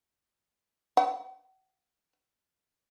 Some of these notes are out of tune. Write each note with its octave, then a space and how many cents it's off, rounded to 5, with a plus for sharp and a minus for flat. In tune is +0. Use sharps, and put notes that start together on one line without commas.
F#5 +40